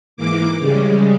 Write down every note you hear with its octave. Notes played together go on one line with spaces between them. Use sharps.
G#2 E3 A#3 D6
C#3 G3 G#3